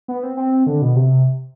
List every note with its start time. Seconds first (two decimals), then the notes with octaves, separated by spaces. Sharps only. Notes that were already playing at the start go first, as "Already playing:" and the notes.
0.08 B3
0.23 C4
0.37 C4
0.67 D3
0.82 B2
0.96 C3